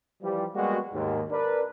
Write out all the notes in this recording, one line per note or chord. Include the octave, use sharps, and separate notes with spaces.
E3 F3 G3
G3 G#3 A#3 B3 F#4
D#2 G#2
D4 A#4 B4 D5